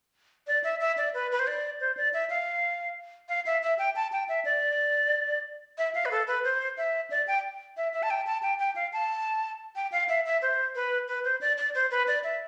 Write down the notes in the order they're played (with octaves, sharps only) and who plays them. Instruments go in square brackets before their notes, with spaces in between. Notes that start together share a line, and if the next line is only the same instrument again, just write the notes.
[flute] D5
E5
E5
D5
B4
B4
C5
D5
C5
D5
E5
F5
F5
E5
E5
G5
A5
G5
E5
D5
E5
F5
B4
A4
B4
C5
E5
D5
G5
E5
E5
A5
G5
A5
G5
G5
F5
A5
G5
F5
E5
E5
C5
B4
B4
C5
D5
D5
C5
B4
D5
E5